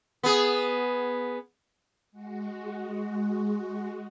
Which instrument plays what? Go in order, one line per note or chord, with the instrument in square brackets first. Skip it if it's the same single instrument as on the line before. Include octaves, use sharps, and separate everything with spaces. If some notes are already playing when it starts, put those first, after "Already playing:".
[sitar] B3 G#4
[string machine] G#3 F#4